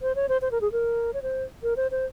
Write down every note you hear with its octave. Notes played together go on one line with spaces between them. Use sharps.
C5
C#5
C5
C5
A#4
G#4
A#4
C#5
C5
A#4
C5
C5